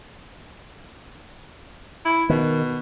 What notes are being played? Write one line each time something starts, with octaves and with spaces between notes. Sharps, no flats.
E4
B2 D#3